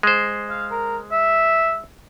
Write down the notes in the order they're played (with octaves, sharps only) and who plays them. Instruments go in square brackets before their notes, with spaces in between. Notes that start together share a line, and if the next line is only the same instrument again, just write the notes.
[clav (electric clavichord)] G#3 C5
[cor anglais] F5
A#4
E5